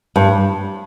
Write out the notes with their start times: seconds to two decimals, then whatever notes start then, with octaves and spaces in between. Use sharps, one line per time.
0.16 G2